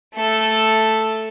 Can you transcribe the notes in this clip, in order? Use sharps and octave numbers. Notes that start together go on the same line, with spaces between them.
A3 A4